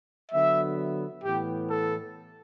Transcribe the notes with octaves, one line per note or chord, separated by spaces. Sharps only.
D3 F#3 B3 E5
A2 E3 B3 G4
A4